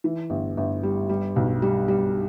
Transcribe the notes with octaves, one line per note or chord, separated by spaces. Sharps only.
E3
G1
G1
G3
G3
B1
G3
G3